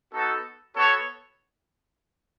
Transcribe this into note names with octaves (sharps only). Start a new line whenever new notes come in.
B3 D#4 F#4 A4
B3 F#4 A4 C#5